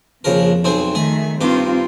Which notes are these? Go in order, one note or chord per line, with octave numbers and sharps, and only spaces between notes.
A#1 F2 C#3 A#4
B1 C4 G#4
D#3 A3 G#4
G2 C4 D#4 F4 D6